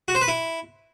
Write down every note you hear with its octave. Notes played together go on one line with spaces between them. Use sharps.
F#4
C5
B4
E4